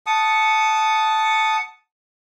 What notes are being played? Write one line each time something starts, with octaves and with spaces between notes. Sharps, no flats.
F#5 A5 D#6